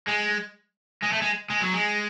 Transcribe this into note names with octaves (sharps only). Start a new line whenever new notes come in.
G#3
G#3
A3
G#3
G#3
F#3
G#3